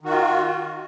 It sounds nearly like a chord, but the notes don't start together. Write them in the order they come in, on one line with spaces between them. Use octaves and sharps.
D#3 F#4 F4